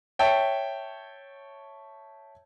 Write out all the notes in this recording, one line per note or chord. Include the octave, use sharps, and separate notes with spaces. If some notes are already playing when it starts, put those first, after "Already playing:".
C#5 E5 G5 A5